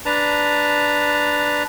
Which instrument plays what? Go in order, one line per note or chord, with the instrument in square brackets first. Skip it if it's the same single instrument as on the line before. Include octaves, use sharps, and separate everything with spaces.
[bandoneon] D4 B4 A5 A#5